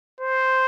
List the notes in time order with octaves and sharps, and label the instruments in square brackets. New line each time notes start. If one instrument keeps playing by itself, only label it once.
[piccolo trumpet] C5